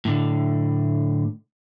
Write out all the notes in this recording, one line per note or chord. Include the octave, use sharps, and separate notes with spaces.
A2 D3